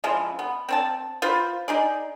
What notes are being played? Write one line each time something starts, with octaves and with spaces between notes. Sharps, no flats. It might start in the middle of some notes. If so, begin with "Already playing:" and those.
C#3 E3 F3 G#3
B3
C4 C#5 A5
F4 B4 C5
D#4 G#4 D5